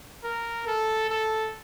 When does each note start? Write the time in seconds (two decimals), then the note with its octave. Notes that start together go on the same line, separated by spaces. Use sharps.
0.24 A#4
0.67 A4
1.10 A4